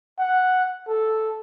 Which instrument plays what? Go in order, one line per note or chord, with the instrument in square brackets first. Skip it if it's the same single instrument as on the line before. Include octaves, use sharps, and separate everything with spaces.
[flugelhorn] F#5
A4